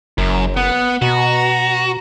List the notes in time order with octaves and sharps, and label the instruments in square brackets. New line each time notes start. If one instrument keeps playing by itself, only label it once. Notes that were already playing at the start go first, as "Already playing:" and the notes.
[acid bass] F#1 [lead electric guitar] F#2
[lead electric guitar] B3 [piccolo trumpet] F#5
[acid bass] B2 [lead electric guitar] F#4 [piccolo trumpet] A#5